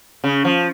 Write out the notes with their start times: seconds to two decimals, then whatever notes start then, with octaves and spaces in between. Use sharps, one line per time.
0.24 C#3
0.45 F3